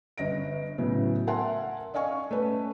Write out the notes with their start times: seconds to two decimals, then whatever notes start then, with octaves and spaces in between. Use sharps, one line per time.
0.18 G1 D#5 A#6 D7
0.78 A2 C#3 F#3 B3
1.27 A#4 E5 F#5 G#5 A5 C6
1.94 D5 D#5 F5 G#5 C#6
2.31 A3 C#4 B4